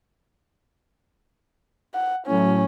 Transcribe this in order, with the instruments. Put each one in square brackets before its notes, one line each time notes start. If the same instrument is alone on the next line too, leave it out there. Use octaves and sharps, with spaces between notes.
[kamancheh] F#5
[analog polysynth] A2 F#3 [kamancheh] C#4